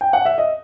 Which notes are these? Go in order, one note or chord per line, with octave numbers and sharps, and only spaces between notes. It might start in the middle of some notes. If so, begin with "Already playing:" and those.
G5
F#5
E5
D#5